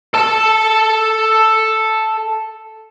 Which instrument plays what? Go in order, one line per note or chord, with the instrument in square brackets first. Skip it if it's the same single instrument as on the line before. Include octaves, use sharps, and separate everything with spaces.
[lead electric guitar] A4 A5